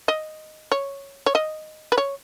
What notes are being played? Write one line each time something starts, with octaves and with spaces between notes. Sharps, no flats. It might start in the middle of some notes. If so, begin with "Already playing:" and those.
D#5
C#5
C#5
D#5
B4
C#5